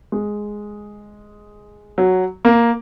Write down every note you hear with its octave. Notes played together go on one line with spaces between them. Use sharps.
G#3
F#3
A#3